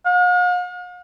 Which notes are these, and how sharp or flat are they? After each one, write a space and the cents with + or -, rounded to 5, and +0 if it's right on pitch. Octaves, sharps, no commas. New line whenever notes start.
F5 +45